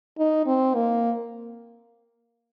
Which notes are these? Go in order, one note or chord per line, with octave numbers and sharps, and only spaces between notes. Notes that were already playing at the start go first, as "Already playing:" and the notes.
D#4
C4
A#3